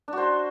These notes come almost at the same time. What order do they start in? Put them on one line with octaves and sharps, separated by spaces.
D4 F#4 C5